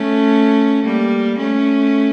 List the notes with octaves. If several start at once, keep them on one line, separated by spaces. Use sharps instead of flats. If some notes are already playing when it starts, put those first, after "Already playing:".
Already playing: A3 C#4
G3 A#3
A3 C#4